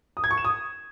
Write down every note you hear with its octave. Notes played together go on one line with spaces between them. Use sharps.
D#6
G#6
C#6
E7
D#6